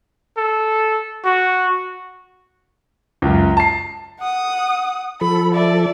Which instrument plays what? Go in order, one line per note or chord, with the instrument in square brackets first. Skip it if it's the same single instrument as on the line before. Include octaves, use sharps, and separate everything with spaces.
[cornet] A4
F#4
[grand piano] C#2 F#2
A5 C7
[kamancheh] F#5 D#6
[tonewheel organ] F3 A4 [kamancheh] B5
[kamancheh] D5 E5